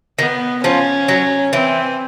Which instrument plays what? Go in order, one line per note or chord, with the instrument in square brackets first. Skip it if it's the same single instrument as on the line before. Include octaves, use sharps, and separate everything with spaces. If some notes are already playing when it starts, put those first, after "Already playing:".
[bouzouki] D#3 [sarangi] B3
[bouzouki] F3 [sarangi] C#4
[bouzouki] F#3
[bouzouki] E3 [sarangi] C4